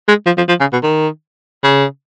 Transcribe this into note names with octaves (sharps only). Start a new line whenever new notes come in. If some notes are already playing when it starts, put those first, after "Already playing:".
G#3
F3
F3
F3
C#3
B2
D#3
C#3